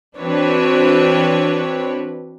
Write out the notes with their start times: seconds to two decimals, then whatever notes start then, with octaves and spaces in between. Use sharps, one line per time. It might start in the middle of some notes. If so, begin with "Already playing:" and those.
0.17 E3 C4 D4 F#4 B4 C#5